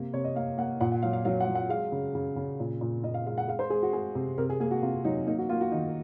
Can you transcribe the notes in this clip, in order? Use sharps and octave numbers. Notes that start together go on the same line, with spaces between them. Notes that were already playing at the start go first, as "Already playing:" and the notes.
Already playing: C3 A#3
C3 C#5
D#5
A#3 F5
A#3 F#5
A#2 F#5
F#5
F#3 F5
F5
F#3 F5
F#5
F#3
F#5
G#3 F5
C#3
C#3
C#3
A#2
A#2
A#2 D#5
F5
G#3 F5
F#5
G#3 F5
C5
G#3 G#4
F#4
G#3 G#4
C3
C3 A#4
G#4
A#3 G#4
F#4
C3 F4
F#3 D#4
A#3 D#4
F#4
A#3 F4
F#4
D#3 D#4